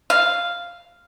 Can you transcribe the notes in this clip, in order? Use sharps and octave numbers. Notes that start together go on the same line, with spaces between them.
F5